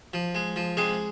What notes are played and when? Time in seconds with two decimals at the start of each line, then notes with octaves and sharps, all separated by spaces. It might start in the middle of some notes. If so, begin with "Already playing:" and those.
0.13 F3
0.35 G#3
0.56 F3
0.77 C3 G#3 G#4